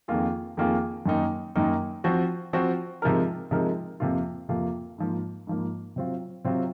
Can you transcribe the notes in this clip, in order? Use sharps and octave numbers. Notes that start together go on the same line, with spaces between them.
F2 D#3 A#3 F4 G#4
F2 D#3 A#3 F4 G#4
F#2 D#3 A#3 D#4
F#2 D#3 A#3 D#4
F3 C4 F#4
F3 C4 F#4
C3 F3 G#3 D#4 A#4
C3 F3 G#3 D#4 A#4
F2 C3 F3 A#3 F4
F2 C3 F3 A#3 F4
G#2 F3 A#3
G#2 F3 A#3
C3 F#3 C4 F4
C3 F#3 C4 F4